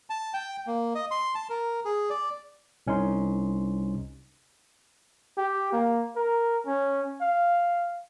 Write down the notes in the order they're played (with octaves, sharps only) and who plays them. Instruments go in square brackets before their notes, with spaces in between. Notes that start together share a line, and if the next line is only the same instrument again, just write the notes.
[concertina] A5
G5
A#3
D#5
C6
A5
A#4
G#4
D5
[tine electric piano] C2 C#4 D#4 C6
[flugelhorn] G4
A#3
A#4
C#4
F5